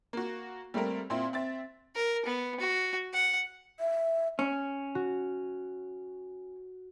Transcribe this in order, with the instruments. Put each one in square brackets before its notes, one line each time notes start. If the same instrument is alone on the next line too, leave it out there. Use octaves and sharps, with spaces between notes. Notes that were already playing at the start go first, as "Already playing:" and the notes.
[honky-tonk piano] A#3 F#4
G3 A3 A#3 C4 A#4
A#2 C4 E4
C4 E5 A6
[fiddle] A#4
B3
F#4
F#5
[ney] E5
[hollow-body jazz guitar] C#4
[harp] F#4